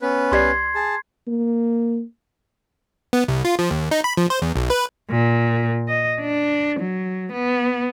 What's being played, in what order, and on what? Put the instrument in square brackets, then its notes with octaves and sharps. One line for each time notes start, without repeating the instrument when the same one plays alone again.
[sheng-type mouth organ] B3 C#4 B4
[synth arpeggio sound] C2 G4 D5 [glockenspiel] C6 G#6 C7
[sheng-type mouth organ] G#4 A5
[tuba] A#3
[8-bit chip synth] B3
C2
F4
F3
D#2
D#4
B5
F3
C5
E2
B1
B4
[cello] A#2
D#5
D4
F#3
B3